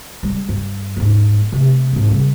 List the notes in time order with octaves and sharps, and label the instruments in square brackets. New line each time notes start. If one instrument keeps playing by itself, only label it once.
[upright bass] G3 G#3
G2
D#1 G#2
C3 A3
D#1 G#1
C#3 G3